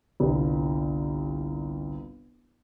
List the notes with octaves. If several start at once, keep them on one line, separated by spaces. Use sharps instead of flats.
G1 C2